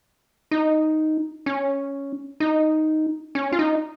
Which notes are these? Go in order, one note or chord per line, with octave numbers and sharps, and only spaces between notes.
D#4
C#4
D#4
C#4
F4
D#4